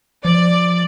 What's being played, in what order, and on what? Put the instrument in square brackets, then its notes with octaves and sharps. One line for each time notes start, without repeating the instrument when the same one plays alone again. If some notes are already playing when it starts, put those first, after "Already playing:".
[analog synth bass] F3 [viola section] D5